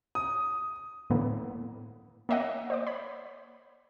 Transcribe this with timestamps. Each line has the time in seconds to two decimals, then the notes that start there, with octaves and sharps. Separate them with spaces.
0.15 D#6
1.10 A2 D3 A#3 B3
2.29 A#3 C#5 D#5 E5 F#5
2.70 C5 D5 D6
2.87 C#5 B5